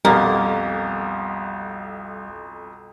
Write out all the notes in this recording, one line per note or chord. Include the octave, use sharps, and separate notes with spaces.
B1 F2 G3 A#3 F5